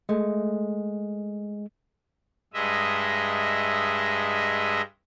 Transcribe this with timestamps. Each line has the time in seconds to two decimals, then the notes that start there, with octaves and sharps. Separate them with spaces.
0.09 G#3 A3
2.54 G2 G#3 D#5 E5